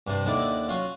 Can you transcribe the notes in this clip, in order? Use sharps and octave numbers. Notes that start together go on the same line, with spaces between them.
G2 C3 D4
D#2 D3 D#3 E4 D5 D6
F#3 C#4 F4